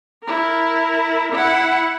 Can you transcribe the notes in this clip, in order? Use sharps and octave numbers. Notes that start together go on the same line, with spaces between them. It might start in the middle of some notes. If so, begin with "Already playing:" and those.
E4 A#4
E4 F#5